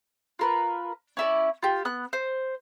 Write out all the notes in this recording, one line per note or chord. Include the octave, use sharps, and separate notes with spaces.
F4 A#4 B4
C#4 E4 D5
F4 G4
B3 F#6
C5